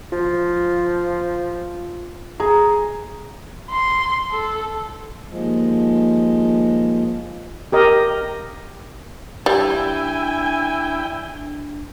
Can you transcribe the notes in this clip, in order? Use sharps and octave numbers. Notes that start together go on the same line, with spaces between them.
F3 F4
G#4 A#5
C6
A4
D#2 F3 G#3
G4 A#4 D#5
G3 D4 E4 G5 G#5